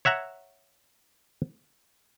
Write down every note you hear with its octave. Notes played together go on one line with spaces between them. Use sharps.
C#5 E5 F#5 A#5